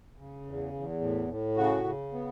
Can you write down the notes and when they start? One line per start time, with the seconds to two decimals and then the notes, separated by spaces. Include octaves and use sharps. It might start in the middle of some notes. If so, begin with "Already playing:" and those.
0.18 C#3
0.45 E2
0.73 E2
1.01 A2
1.28 A2
1.57 C#3 F#4
1.84 C#3
2.13 B3